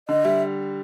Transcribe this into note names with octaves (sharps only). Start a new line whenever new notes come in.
D3 D#5
G3 E5